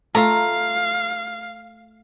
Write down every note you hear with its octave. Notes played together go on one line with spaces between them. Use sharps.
A3 F4 E5 F5 A#5